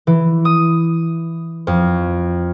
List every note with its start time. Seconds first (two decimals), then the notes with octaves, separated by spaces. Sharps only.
0.07 E3
0.45 D#6
1.67 F2